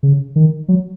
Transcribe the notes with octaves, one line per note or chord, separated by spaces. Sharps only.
C#3
D#3
F#3